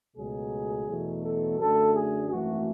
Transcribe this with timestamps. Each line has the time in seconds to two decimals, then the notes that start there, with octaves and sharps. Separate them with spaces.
0.17 C#2 B2 F#3 A3 G#4
0.88 E2 B2 F#3 A3
1.24 A4
1.59 F#2 D3 A3 A4
1.95 G#4
2.30 G#1 F#2 E3 A3 F#4